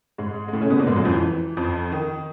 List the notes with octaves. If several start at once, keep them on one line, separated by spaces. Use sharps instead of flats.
G#2 G#3
G#3
A2 A3
C#3 C#4
B2 B3
A#2 A#3
G#2 G#3
F#2 F#3
F2 F3
E3
F2 F3
D#3